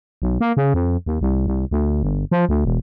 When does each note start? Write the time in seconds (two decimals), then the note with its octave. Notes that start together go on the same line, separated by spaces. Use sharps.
0.22 B1
0.40 A#3
0.57 C#3
0.74 F2
1.06 D#2
1.21 C2
1.47 C2
1.71 D2
2.03 G1
2.31 F3
2.49 D2
2.65 E1